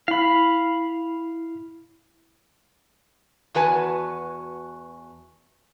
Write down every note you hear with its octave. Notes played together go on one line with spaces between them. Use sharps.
E4 F5 B5
E2 F#4 B4 G#5 A5